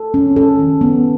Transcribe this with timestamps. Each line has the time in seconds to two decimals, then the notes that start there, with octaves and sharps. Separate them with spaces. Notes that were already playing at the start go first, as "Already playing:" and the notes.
Already playing: A4
0.14 C#4
0.36 A4
0.59 D#3
0.81 B3